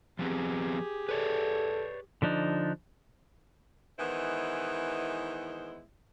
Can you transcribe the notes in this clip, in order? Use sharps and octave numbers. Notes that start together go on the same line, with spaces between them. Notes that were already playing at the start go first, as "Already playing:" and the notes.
F3 B3 C4 G4 G#4
A4 B4 C#5 D5
D3 F3 D4 D#4
D#3 E3 G#3 B3 E4 C5